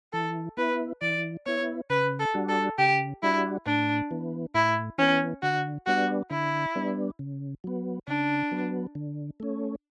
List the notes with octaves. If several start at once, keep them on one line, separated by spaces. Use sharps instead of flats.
E3 A4
B3 E4 B4
E3 D5
B3 E4 C#5
C#3 B4
A4
G3 D4 F#4
A4
C#3 G4
G3 D4 E4 F#4
A2 D4
E3 B3
A2 E4
E3 B3 C#4
D3 F#4
G3 B3 D4 F#4
D3 E4
G3 B3 D4
C#3
F#3 B3
C#3 D4
F#3 B3
D3
A3 C#4